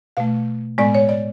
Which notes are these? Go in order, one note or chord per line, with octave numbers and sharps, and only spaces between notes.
B2 A3 F5
A2 G#3 B3 D5
C#5
D5